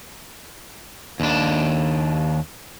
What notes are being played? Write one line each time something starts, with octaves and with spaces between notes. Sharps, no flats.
D#2 D4